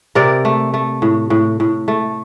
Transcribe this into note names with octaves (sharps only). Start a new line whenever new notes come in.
C3 A#4 D5
A3
A3
A2
A2
A2
A3